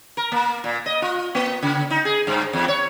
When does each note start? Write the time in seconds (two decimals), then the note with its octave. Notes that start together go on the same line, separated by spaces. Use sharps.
0.17 A#4
0.32 A#3
0.64 A#2
0.86 D#5
1.02 F4
1.35 A#3
1.62 C#3
1.90 D#4
2.05 G#4
2.27 G2
2.53 E2
2.68 C#5